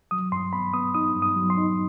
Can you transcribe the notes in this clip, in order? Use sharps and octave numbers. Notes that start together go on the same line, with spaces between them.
F#3 D#6
G2 C6
B3 B5
B3 D#6
D#4 D#6
G2
D#6
F#3
C6
D#4